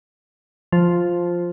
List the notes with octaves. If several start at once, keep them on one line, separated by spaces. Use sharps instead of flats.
F3